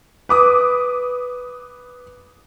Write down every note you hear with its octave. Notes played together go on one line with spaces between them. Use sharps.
B4 D6 D#6